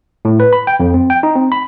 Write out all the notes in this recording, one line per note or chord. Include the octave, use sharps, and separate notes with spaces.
A2
B4
B5
G5
F2
C4
G5
D#4
C4
B5